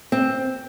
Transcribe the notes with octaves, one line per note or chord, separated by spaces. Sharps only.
C4